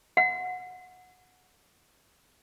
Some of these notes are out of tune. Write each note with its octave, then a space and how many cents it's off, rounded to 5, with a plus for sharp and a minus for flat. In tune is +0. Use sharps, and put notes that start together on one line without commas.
F#5 -20